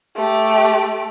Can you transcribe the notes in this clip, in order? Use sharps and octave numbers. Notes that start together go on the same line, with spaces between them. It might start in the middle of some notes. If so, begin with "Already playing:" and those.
A3 G4